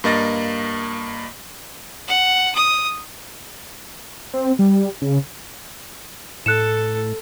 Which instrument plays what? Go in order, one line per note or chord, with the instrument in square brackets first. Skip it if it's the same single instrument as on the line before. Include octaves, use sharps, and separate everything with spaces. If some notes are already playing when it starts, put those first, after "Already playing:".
[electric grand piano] G2 A#3 D#5 A6 A#6
[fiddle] F#5
D#6
[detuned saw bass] C4
G3
C#3
[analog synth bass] A2 [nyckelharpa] A4 [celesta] F#6 C#7 E7